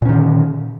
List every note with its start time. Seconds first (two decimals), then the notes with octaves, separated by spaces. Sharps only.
0.02 A#2
0.05 C#4
0.09 D#3
0.12 D3